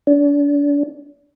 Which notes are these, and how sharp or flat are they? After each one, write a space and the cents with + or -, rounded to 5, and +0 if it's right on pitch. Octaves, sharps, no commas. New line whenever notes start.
D4 -35